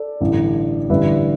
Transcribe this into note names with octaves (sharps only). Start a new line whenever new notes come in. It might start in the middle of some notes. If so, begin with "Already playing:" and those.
Already playing: A4 D5
A1 G2 D3
A1 G2 D3 G3 B4 E5